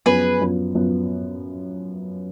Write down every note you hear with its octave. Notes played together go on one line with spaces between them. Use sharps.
F#2 F3 B3 G#4 B4
F#2 F3 B3
F#2 F3 B3